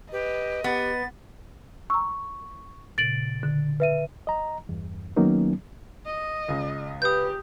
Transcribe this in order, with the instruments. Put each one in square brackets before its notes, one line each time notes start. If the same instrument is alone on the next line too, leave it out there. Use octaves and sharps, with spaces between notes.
[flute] G4 [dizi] B4 [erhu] D#5
[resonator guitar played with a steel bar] B3 [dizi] G4 [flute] A6
[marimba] A#5 E6 [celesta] C#6
[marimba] A#2 C#3 [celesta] A6 D7 F#7
[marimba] D3
[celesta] B4 E5 D#7
[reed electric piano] D#5 A#5
E2 G2
D#3 F#3 A#3 B3 C#4 D#4
[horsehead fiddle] D#5
[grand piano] C#2 C#3
[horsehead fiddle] G4 [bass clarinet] B4 [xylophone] D#6 G6